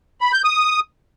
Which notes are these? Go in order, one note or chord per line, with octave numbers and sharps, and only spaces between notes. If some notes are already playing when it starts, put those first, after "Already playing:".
B5
G6
D#6